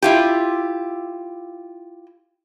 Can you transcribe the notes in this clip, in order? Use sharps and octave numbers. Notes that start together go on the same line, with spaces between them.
E4 F4 G4